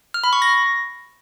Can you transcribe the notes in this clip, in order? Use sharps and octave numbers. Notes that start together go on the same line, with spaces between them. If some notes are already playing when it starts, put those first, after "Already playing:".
F6
B5
C#6
A#6